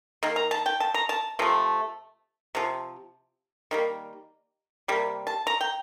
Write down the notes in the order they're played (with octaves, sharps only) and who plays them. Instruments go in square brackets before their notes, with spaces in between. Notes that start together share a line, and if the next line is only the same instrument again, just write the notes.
[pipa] D#3 A#3
A#5
A5
G5
A5
A#5
A5
C3 F3 A3
C3 F3
D#3 G3 A#3
C3 G3 A#3
A5
A#5
G5